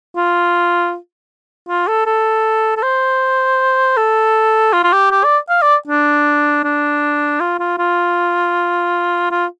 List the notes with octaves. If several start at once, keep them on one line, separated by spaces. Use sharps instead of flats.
F4
F4
A4
A4
A4
C5
A4
F4
F4
G4
G4
D5
F5
D5
D4
D4
F4
F4
F4
F4